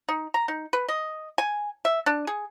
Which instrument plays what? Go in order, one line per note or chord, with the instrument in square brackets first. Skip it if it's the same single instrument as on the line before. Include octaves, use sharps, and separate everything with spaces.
[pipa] D#4
A#5
D#4
B4
D#5
G#5
E5
D4
G#4